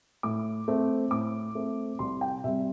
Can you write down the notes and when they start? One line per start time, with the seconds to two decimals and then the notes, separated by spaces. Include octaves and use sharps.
0.23 A2 D6
0.68 A3 C4
1.11 A2 D6
1.55 A3 C4
1.99 C2 C6
2.21 G5
2.44 C3 G3 E5